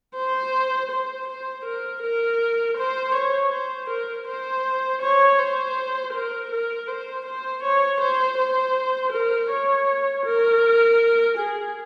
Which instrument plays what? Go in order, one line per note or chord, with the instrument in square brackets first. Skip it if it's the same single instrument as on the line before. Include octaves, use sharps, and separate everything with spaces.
[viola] C5
C5
C5
A#4
A#4
C5
C#5
C5
A#4
C5
C#5
C5
A#4
A#4
C5
C5
C#5
C5
C5
A#4
C#5
A#4
G#4